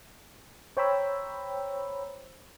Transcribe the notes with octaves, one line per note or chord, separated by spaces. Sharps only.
C5 C#5 G5 A#5 B5 E6